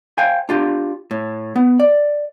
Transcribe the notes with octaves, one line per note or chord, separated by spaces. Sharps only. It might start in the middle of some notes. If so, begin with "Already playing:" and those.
C5 F5 G5 G#5
D4 F4 G4
A2
B3
D5